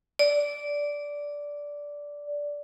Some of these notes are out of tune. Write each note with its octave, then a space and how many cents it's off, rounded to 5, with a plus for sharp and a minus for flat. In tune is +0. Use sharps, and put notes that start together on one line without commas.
D5 -10